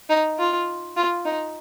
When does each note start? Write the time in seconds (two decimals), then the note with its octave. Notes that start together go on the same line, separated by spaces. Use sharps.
0.09 D#4
0.39 F4
0.96 F4
1.25 D#4